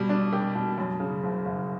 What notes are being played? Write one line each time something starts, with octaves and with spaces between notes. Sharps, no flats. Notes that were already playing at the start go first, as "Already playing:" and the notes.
Already playing: B2 G3
D4
G4
B2
F#2
C#3
F#1
F#1